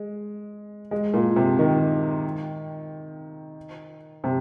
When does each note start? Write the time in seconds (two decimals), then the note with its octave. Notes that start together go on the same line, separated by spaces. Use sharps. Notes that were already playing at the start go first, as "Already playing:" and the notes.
Already playing: G#3
0.91 G#3
1.14 A#2
1.36 C3
1.59 D#3
4.24 C3